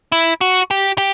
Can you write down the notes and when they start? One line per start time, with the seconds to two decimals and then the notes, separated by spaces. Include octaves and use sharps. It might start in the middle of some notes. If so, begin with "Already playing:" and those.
0.12 E4
0.41 F#4
0.71 G4
0.98 G4